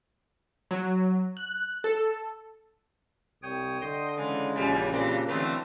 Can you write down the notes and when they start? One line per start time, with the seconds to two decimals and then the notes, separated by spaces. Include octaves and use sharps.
0.71 F#3
1.37 F#6
1.84 A4
3.43 C2 C#5 G5 D#6
3.82 D3 D#5 G5 C6
4.17 C#3 E3 G#3
4.56 A#1 F#2 E3 G3
4.92 A#2 E3 G3 C4 D4 A#6
5.28 D3 E3 F#3 A3 B3 C4 E5